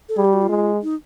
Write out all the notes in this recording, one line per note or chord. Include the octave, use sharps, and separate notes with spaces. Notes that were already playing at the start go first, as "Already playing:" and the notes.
A4
G3 G#4
G4
F#4
F4
G#3
D#4